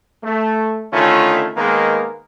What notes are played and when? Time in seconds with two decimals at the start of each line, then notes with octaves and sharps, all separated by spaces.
0.24 A3
0.93 D3 D#3 A3 C#4 E4 F4
1.57 D#3 G#3 A#3 B3 A#4